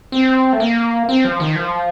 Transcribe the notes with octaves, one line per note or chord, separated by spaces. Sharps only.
C4
A3
A#3
C4
F3
D#3
F3